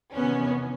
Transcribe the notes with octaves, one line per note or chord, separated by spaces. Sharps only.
E2 C3 D#3 B3 C#4